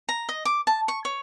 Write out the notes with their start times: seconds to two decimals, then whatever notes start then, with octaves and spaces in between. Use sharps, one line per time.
0.09 A#5
0.29 D#5
0.45 D6
0.67 A5
0.88 C#6
1.05 C#5